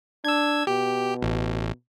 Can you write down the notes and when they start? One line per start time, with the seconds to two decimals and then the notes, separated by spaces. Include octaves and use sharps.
0.25 D4 E6 G#6
0.67 B2 G4
1.23 A1